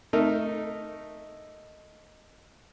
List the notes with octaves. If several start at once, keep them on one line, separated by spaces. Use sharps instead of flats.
A3 D#4 A#4